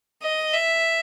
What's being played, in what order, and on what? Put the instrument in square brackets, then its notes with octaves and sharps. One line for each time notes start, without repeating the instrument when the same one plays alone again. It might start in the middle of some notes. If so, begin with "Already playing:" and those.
[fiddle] D#5
E5